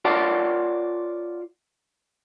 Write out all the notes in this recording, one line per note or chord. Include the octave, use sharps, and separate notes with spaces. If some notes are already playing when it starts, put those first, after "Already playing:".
F4 A#4 C#5 D5 F#5 A5